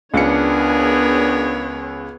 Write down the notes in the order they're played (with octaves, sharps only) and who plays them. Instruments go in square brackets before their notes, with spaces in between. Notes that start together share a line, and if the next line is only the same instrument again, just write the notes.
[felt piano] C#2 C#7 [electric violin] B3 C#5 [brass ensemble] D4 [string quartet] G#4 A#4